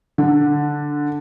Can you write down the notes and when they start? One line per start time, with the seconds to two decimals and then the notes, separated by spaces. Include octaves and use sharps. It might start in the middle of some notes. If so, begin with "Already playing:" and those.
0.18 D3